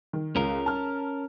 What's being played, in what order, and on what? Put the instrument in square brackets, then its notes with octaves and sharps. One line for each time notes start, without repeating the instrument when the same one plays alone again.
[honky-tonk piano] D#3
[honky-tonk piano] C#2 [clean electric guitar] C#4 A#4
[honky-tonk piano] A5 F6